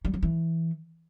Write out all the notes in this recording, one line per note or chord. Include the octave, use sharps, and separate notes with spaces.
G3
F#3
E3